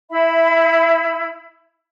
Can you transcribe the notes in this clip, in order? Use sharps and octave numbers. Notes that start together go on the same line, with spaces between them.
E4 E5 B5